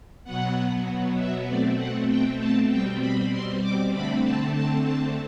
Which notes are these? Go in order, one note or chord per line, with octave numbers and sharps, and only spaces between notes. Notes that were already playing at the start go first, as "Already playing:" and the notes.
B2 F#3 B3 F#5
E5
B2 A3 C4 D5
F#5
G5
A5
B2 G3 C4 G5
B5
C6
D6
D3 A3 C4 B5
A5
A5
A5